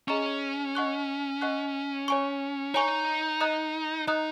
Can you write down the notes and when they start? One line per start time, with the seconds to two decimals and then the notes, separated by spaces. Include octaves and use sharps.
0.08 C#4 G#4 D#5 A#5 C#6
0.75 D#5 F#5 C#6 F#6
1.41 D#5 F#5 C#6 F#6
2.08 C#5 G#5 C#6
2.74 D#4 C#5 G#5 C#6
3.41 D#5 A#5 D#6 F#6
4.07 D#4 D#5 A#5 D#6 F#6